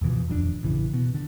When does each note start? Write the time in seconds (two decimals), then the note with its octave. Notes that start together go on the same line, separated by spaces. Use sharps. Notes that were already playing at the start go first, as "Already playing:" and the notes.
0.01 E2 B2 E3 F3
0.28 D#1 F2 G#3 D4
0.63 A1 C#3 E3
0.94 B2
1.15 D3